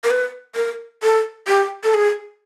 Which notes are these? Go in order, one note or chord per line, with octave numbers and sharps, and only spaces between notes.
A#4
B4
A#4
A4
G4
A4
G#4